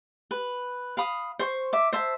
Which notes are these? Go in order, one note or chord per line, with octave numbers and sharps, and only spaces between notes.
B4
F5 B5 D#6
C5 C#6
E5 D6
C5 E5 A5